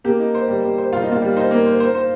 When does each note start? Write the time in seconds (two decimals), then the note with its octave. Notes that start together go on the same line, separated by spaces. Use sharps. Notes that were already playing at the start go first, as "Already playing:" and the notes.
0.04 A#3 G4
0.19 D#4
0.35 C5
0.48 G3
0.64 G3
0.78 C5
0.93 G3 F4
1.02 D#4
1.08 A#3 F4
1.22 G3
1.36 D#4 C5
1.51 A#3
1.66 C5
1.80 C5
1.95 C5